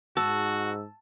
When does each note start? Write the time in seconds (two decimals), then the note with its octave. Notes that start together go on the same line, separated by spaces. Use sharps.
0.17 G#2 F#4 A5 E6